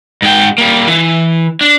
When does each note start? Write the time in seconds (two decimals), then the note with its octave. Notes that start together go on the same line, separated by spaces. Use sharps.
0.22 G#2 G5
0.58 G3 A#3
0.87 E3
1.61 D4